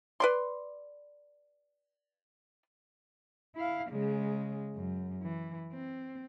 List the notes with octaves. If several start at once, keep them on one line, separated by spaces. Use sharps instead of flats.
B4 D5 C6
E4 F5
C#3 G#3
F#2
E3
C4